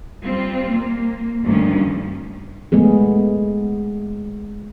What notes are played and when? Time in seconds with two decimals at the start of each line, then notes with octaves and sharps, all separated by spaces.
0.24 G3 C4 F4
0.72 A#3
1.43 D2 G2 D#3 F3 C#4
2.72 G#3 A3 B3 G#4